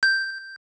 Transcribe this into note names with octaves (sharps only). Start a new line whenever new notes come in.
G6